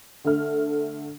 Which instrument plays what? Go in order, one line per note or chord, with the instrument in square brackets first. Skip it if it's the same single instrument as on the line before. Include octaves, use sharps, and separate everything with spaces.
[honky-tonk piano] D3 A3 F6